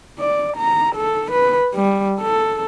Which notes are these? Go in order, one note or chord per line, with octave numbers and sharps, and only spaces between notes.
D5
A#5
A4
B4
G3
A4